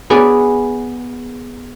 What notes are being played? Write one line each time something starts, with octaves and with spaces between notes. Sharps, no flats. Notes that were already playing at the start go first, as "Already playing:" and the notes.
B3 G#4 D5